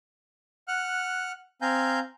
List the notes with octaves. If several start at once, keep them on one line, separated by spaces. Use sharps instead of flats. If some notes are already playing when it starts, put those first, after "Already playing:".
F#5 F6 F#6
C4 F5 G#5 A#5 G6